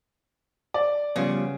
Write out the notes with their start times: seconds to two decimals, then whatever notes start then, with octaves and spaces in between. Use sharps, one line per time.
0.74 D5
1.16 C#3 F3 G3 B3